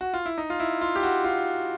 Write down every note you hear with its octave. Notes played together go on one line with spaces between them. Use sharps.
F#4
F4
E4
D#4
F4
E4
F4
G4
F#4
F4